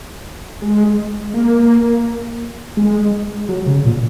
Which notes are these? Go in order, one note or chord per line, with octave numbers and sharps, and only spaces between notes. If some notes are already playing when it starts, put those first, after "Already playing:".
G#3
A#3
G#3
F#3
C#3
A#2